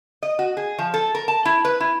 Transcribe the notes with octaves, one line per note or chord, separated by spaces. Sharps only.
D#5
F#4
G#4
F3
A4
A#4
A5
E4
B4
E4